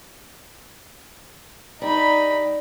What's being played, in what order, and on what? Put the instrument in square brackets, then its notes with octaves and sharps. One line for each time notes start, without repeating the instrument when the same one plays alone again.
[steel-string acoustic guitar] G3 [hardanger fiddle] D#4 B5